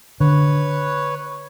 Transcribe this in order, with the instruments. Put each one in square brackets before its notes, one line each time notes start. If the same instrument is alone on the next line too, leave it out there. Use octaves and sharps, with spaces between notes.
[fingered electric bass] D3 [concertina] B4 C#5